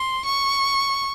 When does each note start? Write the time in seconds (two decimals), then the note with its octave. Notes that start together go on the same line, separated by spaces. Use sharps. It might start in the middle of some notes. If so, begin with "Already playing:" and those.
Already playing: C6
0.25 C#6